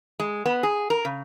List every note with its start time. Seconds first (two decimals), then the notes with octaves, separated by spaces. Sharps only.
0.20 G#3
0.45 B3
0.63 G#4
0.90 A#4
1.05 C#3